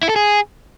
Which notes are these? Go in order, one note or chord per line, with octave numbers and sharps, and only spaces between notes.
E4
A4
G#4